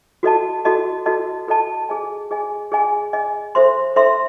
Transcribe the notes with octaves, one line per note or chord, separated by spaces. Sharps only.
F#4 A4 D#5 A5
F#4 A4 D#5 A5
F#4 A4 D#5 A5
F#4 A4 D#5 A5
G#4 D#5 G#5
G#4 D#5 G#5
G#4 D#5 G#5
G#4 D#5 G#5
A4 C5 E5 C6
A4 C5 E5 C6